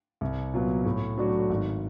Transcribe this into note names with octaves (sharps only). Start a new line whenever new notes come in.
C2
A#2 F#3 B3
A2
F#3 A3 D4 F#4
G#1